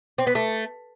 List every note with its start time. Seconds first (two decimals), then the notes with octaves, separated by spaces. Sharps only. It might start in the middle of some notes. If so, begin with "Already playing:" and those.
0.18 C4
0.27 B3
0.35 A3